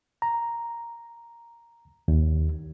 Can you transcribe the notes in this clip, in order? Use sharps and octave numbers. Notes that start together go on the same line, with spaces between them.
A#5
D#2